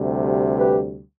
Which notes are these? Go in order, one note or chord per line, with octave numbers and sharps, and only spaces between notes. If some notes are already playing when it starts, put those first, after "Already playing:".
Already playing: D2 C3 G3
G4 B4